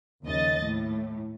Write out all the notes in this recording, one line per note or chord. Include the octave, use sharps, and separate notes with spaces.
D#2 C#3 F3 D#5 A6
A2